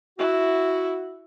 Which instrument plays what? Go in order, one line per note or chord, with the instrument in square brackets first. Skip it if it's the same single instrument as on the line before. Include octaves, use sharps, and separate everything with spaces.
[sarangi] E4 [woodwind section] F#4